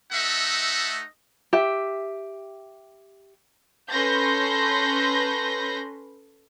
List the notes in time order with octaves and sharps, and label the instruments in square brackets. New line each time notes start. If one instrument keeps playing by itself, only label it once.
[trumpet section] A3 D#4 A4 D#5 E5 F#5
[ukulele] G4 E5
[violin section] C#4 A4 B4 C6 G6 A#6